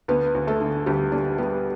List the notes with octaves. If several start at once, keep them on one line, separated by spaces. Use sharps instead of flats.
D2 B3 B4
D2
A3 A4
D3
D2 G3 G4
D3 D4
G3 B3